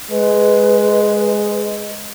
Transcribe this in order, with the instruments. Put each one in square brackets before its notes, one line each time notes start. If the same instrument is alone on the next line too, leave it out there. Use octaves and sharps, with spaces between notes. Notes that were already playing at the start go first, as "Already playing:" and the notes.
[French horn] G#3 [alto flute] B4